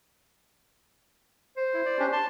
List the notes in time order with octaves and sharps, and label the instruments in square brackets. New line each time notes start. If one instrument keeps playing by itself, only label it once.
[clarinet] C5
[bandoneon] E4
D5
C#4 D4 G4
A5 C6